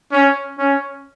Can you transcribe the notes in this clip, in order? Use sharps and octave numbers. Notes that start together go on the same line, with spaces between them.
C#4
C#4